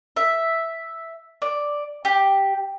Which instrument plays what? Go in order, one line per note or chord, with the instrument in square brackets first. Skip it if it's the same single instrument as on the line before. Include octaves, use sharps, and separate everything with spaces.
[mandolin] E5
D5
G4